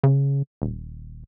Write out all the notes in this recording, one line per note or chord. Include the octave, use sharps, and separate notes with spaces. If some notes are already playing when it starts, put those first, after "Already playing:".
C#3
D#1